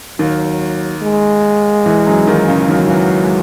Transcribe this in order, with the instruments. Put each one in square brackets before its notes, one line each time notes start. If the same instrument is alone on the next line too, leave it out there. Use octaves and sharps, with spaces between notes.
[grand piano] D#2 D#3 [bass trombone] F#3
[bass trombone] G#3
[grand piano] E2 E3
F#2 F#3
D#2 D#3
C#2 C#3
[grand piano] D#2 D#3 [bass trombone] F#3
[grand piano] D#3
E2 E3
G#3